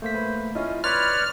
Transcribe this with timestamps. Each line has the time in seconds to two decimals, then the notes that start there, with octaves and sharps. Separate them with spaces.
0.02 A3 A#3 C5 B6
0.14 B4
0.55 C#4 E4 F4 D#5
0.84 B4 C#5 D5 B5 C6 F6 A6